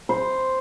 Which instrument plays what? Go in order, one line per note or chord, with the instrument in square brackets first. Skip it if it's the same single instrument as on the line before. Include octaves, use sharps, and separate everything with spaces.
[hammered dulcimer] C5